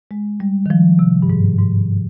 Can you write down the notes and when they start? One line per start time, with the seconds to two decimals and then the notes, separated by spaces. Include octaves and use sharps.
0.11 G#3
0.40 G3
0.66 D#3
0.70 F3
0.99 C3
1.22 G2
1.30 G#2
1.59 G#2